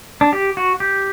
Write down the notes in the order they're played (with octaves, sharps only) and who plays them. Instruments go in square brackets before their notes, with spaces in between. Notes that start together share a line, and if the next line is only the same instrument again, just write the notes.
[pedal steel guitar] D4
G4
F#4
G4